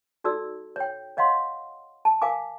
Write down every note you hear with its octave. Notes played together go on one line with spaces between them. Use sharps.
D#4 F#4 A4 D5 E6
C#5 G5
C#5 D#5 F5 F#5 C6
A5
A#4 F5 G#5 D6